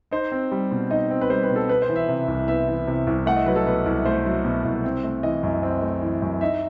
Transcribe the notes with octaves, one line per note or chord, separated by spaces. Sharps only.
D#4 C5
C4
G3
B2
D#4 D#5
C4
B4
G3 C5
B4
B2
A4
B3 B4
C5
E3
E5
C3
C2
B3 E5
E3
C3
C2
A3 F#5
D#5
F#3 B4
A4
B2 B4
C2
A3 C5
F#3
B2
C2
C4
A3
E3 D#5
F#2
C4
A3
E3
F#2
D#4 E5